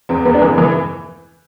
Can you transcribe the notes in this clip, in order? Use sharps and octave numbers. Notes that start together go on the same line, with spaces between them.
E2 C4
E2 B3
D4
E3 C4
E3